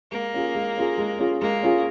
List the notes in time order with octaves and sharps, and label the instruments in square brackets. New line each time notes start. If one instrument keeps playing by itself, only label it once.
[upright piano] G#3 [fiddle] A#3
[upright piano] C#4 F4 G#4
G#3
C#4 F4 G#4
G#3
C#4 F4 G#4
[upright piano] G#3 [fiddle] A#3
[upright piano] C#4 F4 G#4